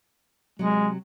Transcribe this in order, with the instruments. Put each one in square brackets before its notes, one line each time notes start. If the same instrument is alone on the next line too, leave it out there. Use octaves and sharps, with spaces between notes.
[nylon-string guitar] C3 F#3 [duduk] G#3